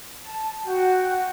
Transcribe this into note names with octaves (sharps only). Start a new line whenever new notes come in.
A5
F#4 G5